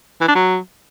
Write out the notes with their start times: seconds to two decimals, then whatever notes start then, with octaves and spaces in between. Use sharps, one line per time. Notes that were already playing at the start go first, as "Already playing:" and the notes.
0.21 E3
0.28 D4
0.35 F#3